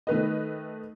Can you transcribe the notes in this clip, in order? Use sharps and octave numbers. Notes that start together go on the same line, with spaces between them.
D#3 A3 B4 D#5